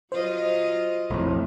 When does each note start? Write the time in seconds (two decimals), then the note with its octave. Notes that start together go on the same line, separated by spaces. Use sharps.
0.12 F#3 F4 C5 D#5
1.10 B1 F2 A2 A3